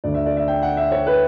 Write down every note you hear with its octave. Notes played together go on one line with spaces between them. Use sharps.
D2 D3 D5
E5
D5
E5
G5
F#5
E5
C#5
B4